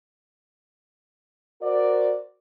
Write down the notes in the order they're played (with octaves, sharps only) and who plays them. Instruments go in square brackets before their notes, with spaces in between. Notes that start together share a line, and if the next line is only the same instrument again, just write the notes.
[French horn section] F#4 A#4 C5 D5